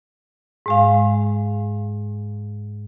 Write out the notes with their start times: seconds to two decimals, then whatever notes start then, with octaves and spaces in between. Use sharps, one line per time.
0.66 G#2 G#3 F5